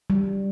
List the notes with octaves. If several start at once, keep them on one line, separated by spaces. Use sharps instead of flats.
G3